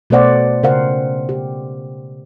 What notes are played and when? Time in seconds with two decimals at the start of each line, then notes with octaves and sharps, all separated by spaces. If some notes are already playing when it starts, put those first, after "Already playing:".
0.10 B2 A3 B3 C5 D5 F#5
0.63 C#3 A#4 C5 F5 F#5
1.29 G4